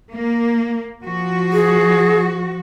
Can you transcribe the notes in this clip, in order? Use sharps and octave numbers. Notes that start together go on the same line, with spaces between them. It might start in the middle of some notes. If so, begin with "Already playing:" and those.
A#3
F3 F#4
G#4